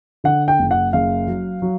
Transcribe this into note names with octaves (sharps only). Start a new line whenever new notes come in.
D3 F#5
G5
F#1
F#5
F#1 F5
F#3
F#3